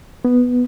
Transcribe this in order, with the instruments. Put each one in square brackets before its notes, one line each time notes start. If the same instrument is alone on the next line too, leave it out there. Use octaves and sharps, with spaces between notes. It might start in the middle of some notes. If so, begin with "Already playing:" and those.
[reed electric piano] B3